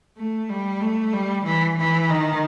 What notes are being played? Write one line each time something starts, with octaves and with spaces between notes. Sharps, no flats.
A3
G3
A3
G3
E3
E3
D#3